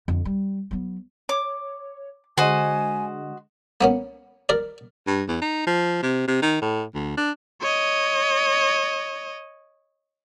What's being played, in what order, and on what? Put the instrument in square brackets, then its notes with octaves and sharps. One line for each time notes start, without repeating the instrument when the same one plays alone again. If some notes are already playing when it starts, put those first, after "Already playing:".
[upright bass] F2 D3
G3
F#3 B3
[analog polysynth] C#5 [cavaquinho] D6
[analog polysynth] D3 G#3 [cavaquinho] F#4 C5 D#5 [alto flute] G#5
[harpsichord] A#3 B3 C#4
A#4 D5
[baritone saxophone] G2
E2
D#4
F3
C3
C3
D#3
A2
D2
D4
[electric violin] C#5 D#5